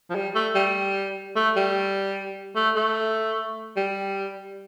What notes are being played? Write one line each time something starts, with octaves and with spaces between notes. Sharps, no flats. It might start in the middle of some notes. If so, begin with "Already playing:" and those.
F3
G3
A3
G3
A3
G3
A3
A3
G3